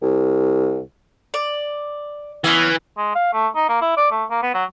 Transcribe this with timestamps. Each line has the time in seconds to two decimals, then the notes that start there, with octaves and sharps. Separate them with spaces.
0.03 C2
1.34 D5
2.44 E3 B3 C#4 G#5
2.98 G#3
3.15 F5
3.33 A3
3.55 D#4
3.69 A#3
3.82 E4
3.97 D5
4.11 A3
4.30 A#3
4.43 B3
4.54 F#3